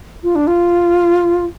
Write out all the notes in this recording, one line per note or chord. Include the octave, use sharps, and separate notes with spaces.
F4
D4
F4